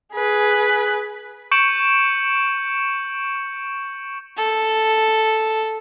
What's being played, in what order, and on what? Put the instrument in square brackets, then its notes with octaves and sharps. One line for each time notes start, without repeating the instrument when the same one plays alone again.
[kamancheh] G#4 B4
[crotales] C#6 G6 C#7 D7 E7 F#7
[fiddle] A4